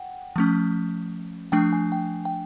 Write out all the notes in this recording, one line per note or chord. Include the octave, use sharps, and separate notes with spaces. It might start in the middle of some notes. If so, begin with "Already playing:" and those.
Already playing: F#5 G5
F3 A3 C#4
F3 A3 D4 G5
G#5
G5
G5